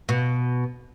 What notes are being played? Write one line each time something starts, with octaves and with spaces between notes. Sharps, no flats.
B2